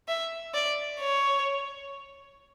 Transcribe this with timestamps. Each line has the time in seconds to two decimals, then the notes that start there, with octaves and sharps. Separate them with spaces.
0.08 E5
0.54 D5
1.00 C#5